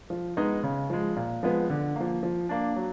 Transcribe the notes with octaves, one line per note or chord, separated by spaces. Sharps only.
F3
G#3 B3 D#4
C#3
F3 G#3
A#2
F3 G#3 B3
D3
F3 A#3
F3
A#3 D4
F#3